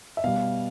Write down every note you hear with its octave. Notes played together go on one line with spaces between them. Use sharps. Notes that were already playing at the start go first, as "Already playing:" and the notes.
E5
B2 G3 F5